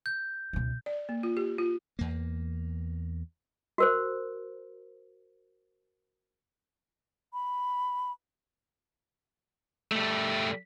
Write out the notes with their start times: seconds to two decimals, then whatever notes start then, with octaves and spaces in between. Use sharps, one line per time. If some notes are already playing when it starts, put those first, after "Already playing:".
0.06 G6
0.53 C#2 B2
0.86 D5
1.09 A#3
1.23 F4
1.37 G4
1.58 F4
1.99 E2 A#3
3.78 F#4 A#4 C5
7.33 B5
9.92 G3 A3